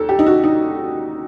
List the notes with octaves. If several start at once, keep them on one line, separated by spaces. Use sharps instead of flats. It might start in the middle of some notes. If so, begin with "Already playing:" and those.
Already playing: D#2 A4
G4
D#4
F#4
D#4